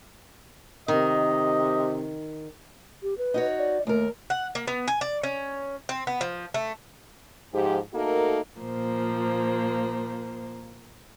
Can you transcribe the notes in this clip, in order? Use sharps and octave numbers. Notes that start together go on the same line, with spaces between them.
C3 D#3 D#5
G4
B4
D#4 F#4 C#5
D5
D#2 A3 A#4
F#5
A#3
B3
G#5
D5
C#4
C4
B3
F3
A3
G#2 F3 G4
A3 A#3 D#4 F#4 A4 A#4
A#2 F3 A#3 C5